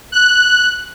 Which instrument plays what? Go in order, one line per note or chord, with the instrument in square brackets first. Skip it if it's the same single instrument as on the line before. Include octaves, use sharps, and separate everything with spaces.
[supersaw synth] F#6